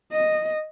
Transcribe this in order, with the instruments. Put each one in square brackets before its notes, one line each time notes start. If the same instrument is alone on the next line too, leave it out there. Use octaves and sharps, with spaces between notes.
[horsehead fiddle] D#5